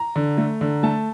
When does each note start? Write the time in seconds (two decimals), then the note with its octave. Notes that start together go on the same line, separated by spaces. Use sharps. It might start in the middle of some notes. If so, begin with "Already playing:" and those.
Already playing: A#5
0.16 D3
0.38 A3
0.61 D3
0.83 A3 A5